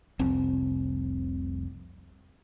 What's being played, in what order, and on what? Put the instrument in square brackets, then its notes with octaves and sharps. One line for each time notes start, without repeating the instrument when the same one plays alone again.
[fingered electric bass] F1 C2 C4